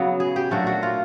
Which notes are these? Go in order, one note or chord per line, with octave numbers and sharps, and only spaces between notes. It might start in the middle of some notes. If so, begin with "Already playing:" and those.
Already playing: C#3 F#3 B3
G#4
G4
A#2 F#3 A3 D4 F#4
F#4
F4